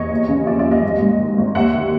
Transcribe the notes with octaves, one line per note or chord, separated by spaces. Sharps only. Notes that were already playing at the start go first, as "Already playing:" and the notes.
Already playing: E2 C#5 D#5
D#2
C#3
F3 D5 E5
D5 E5
D#2
D#5 F5
G#1
G#2
D#3
G#1
D#2 E5 F#5
D#3